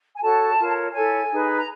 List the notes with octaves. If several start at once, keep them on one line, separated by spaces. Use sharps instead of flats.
G#5
F#4 A4 C#5 A5
F4 A#4 C#5
E4 A4 C#5 G#5
D#4 G#4 B4
A#5